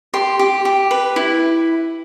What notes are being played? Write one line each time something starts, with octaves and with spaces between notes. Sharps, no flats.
G4 C6
G4
G4
B4
E4